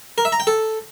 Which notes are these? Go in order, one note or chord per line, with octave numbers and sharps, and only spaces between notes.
A#4
E5
A#5
G5
A4